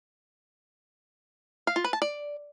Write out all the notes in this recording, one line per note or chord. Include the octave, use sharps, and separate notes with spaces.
F5
F4
B4
A5
D5